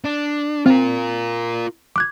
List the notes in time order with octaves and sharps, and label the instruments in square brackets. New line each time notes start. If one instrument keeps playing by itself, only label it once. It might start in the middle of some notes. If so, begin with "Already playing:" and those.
[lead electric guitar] D4
[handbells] C4 [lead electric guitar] F4 A#4
[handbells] D6 F#6 G#6